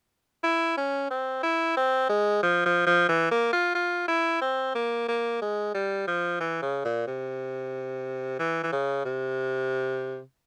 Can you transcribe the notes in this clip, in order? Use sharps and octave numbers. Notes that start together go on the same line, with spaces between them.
E4
C#4
C4
E4
C4
G#3
F3
F3
F3
E3
A#3
F4
F4
E4
C4
A#3
A#3
G#3
G3
F3
E3
C#3
A#2
C3
E3
E3
C#3
C3